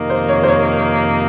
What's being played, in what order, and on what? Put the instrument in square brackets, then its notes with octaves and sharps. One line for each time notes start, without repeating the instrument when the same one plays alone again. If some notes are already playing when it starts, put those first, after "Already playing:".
Already playing: [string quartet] F2 C3 D#3 A#3 D#4
[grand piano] C5
C#5
C5
C#5